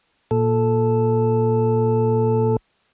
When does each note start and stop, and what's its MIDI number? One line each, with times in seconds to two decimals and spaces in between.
0.31 2.57 46
0.31 2.57 69